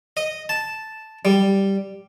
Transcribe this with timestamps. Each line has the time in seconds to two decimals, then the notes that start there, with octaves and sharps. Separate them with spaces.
0.17 D#5
0.49 A5
1.25 G3